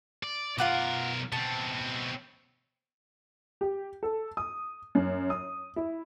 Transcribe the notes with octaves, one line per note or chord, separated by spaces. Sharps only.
D5
B1 F4 A#4 F#5 D6
B2 C4 A5
G4
A4
D#6
F#2
D#6
E4